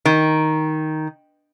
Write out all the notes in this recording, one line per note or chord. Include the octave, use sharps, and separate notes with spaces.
D#3